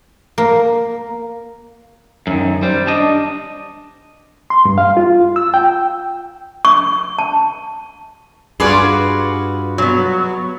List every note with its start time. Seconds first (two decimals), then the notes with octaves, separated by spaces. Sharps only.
0.38 A#3
2.27 F#2 D#3
2.63 G3 C5
2.87 D4 D#5
4.50 C6
4.65 G2
4.78 F5
4.97 F4
5.36 E6
5.54 G5
6.65 C#6
7.19 A5
8.60 G2 F4 F#4 G#4 B4 D5 C6
9.78 F#3 B3